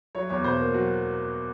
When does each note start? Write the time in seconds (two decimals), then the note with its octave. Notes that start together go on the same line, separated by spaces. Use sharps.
0.15 F#3 C#5
0.30 E2 C#5
0.44 B2 C5
0.59 A#3
0.73 F#3 F#4